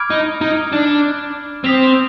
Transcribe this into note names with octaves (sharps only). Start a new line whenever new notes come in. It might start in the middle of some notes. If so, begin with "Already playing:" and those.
Already playing: B5 D6 F6 G#6 D7
D#4
D#4
D4
C4 D#6 B6 F7